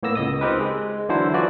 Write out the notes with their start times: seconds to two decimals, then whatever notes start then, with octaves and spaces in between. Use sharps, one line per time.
0.03 A2 A#3 B3 E6 A#6
0.15 C#2 D#5 D#6
0.41 C4 D#4 G4 A#4 B4
0.60 G#3
1.09 D3 E3 F#3 E4 A4 C5
1.34 E3 F3 F#4 B4 D5